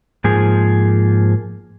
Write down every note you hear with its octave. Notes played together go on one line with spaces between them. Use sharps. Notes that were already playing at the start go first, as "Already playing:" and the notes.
G#2 F3 A#3 G#4